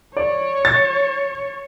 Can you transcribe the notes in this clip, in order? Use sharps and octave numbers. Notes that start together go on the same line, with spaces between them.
C#5 D5
A6